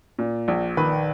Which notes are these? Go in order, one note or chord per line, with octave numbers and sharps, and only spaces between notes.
A#2
A#1
D#3 B4